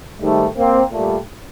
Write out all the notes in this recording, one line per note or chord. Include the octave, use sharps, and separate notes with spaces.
G#2 D#3 G3 A3
A#3 C4
A#2 G3 A3